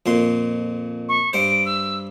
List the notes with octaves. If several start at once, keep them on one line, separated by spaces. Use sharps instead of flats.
F2 A#2 C6
C#6
G2 C5 D7
E6